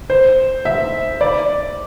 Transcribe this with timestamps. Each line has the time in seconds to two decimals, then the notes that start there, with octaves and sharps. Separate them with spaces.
0.10 C5
0.65 E5
1.21 D5